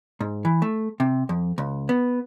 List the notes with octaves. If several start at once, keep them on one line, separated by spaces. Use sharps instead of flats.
G#2
E3
A3
C3
F2
C#2
B3